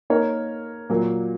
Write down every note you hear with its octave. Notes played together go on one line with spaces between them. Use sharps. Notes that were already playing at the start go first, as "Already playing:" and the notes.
A#3 D#4 A#4 C#5
A#2 F#3 A#3